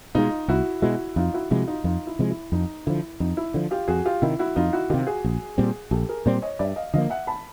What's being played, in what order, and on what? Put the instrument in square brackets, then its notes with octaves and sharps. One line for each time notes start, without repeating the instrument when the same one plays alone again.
[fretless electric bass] B2 G#3 [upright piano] D#4 F4
[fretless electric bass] C2 [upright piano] E4 F#4
[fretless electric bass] B2 G#3 [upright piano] E4 F#4
[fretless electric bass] F2 [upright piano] D#4 F4
[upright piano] E4 F#4
[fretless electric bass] C3 F3 G#3 [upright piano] E4 F#4
[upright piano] D#4 F4
[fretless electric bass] F2 [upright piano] D#4 F4
[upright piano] E4
[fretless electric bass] C3 F3 G#3
[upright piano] E4
[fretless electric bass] F2 [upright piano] D#4
[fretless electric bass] D3 F3 [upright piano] E4
[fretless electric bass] F2 [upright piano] D#4
[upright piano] E4
[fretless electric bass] D3 F3
[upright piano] F4 G4
[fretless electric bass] F2 [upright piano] F#4 G#4
[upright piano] F4 G4
[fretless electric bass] C3 D#3 [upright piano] E4
[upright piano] E4 F#4
[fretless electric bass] F2 [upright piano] D#4 F4
[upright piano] E4 F#4
[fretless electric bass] C3 D#3 [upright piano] F4 G4
[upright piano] F#4 G#4
[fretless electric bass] A#1
A#2 G3 C4
[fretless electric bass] A#1 [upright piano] G4 A4
[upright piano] G#4 A#4
[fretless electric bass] A#2 G3 C4 [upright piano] C5 D5
[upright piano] C#5 D#5
[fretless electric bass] G2 [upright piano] D5 E5
[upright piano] D#5 F5
[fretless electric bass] D3 F3 A#3 [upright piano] D#5 F5
[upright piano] E5 F#5
A5 B5